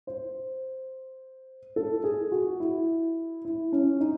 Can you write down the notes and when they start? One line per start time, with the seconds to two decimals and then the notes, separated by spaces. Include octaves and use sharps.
0.07 C5
1.76 A4
2.04 G#4
2.32 F#4
2.60 E4
3.45 E4
3.72 C#4
4.01 D#4